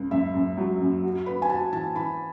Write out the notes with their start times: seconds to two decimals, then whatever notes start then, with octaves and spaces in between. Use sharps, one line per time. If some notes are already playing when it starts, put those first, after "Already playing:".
Already playing: C#2
0.11 F#2 E5
0.34 F#2
0.57 F#3
0.81 F#2
1.03 F#4
1.26 B4 B5
1.42 G#5
1.49 F#4 A5
1.72 E3 A5
1.96 E3 B5